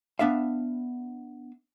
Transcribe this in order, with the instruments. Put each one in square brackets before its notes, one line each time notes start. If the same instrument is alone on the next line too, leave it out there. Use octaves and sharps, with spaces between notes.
[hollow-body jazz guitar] B3 D4 E5 F5